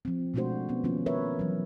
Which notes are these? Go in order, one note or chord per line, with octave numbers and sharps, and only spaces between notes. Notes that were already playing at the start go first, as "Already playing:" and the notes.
F3 C4
B2 G#3 A3 D4 F#4 C5
B3 C#4
D#3 F3 A#3 C#4 F4
A#4 B4 C#5 E5
E3 F#3